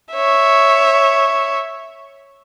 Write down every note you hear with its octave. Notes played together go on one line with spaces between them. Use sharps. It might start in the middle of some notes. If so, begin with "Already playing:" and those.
C#5 E5